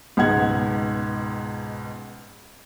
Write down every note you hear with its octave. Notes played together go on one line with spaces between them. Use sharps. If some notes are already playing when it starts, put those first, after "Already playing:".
C#2 G#2 B2 F#5 G#6